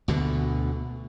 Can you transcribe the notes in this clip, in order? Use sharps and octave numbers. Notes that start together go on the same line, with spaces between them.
D2 B2 D3